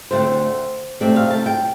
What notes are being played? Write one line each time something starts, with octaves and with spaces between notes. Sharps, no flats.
D2 D3 A3 C4 C5
C3 A3 C4 D5
F5
A5
G5